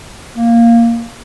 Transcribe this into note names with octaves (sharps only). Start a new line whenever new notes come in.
A#3